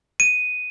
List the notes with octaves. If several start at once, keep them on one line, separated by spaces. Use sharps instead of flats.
D#7